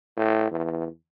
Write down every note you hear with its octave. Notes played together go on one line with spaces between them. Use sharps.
A2
E2